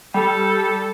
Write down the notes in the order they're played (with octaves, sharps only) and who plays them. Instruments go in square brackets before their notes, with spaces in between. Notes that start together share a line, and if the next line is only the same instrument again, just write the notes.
[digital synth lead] G3 [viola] A4